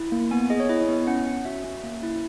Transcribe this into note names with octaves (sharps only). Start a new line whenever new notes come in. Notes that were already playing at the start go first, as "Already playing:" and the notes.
Already playing: E4
A#3
B3 G#5
G#4 D#5
C#5
E4 D#5
B3
C#4 F#5
C#4
F#4 E5
C#4
A#3
E4